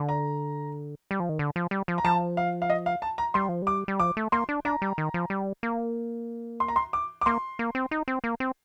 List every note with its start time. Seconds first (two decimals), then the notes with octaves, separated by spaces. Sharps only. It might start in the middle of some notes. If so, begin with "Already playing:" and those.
Already playing: D3
0.09 A#5
1.11 G3
1.20 F3
1.29 D#3
1.39 D3
1.56 F3
1.71 G3
1.88 F3
1.98 A#5
2.04 F3 A5
2.37 F5
2.62 F5
2.70 D#5
2.86 F5
3.02 A5
3.18 A#5
3.34 G3 C6
3.49 F3
3.62 G3 D6
3.88 G3
4.00 F3 D6
4.17 A3
4.32 A#3 C6
4.49 D4
4.65 D4 A#5
4.82 G3
4.98 D#3
5.14 F3
5.30 G3
5.63 A#3
6.60 C6
6.68 A#5
6.76 C6
6.93 D6
7.21 D6
7.26 A#3 C6
7.59 A#3
7.75 C4
7.91 D#4
8.08 C4
8.24 A#3
8.40 C4